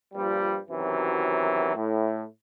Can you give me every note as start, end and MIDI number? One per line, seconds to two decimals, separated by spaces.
0.14 0.58 43
0.14 0.58 46
0.14 0.58 53
0.14 0.58 55
0.70 1.73 42
0.70 1.73 48
0.70 1.73 51
0.70 1.73 52
0.70 1.73 54
1.75 2.25 45